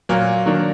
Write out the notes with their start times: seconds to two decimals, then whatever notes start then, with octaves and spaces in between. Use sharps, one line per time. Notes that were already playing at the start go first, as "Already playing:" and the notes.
0.09 A#2 F#3 A#3
0.46 D#3 F#3 A#3 D4